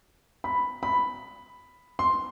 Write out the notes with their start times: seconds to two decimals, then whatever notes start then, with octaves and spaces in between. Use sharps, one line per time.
0.44 B5
0.83 B5
1.99 C6